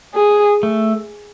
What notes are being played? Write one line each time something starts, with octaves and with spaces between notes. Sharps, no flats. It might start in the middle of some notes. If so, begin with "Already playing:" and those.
G#4
A3